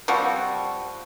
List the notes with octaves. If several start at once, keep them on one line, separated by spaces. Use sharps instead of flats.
F3 G3 C4 F#4